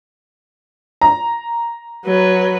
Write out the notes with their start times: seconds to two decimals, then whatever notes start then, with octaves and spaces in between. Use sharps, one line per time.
1.01 A#5
2.06 F#3 B4